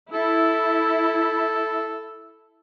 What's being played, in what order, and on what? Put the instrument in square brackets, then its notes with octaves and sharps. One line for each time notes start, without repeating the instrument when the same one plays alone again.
[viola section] E4 [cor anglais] A4